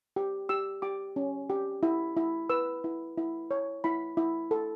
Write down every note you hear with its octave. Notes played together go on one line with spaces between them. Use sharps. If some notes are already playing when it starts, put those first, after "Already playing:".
G4
G4 E6
G4 D6
C#4
G4
E4
E4
B4 E6
E4
E4
C#5
E4 B5
E4
A4